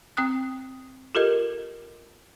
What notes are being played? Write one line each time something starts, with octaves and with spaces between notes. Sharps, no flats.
C4 G5 D#6 F#6
F4 G4 A4 A#4 D#5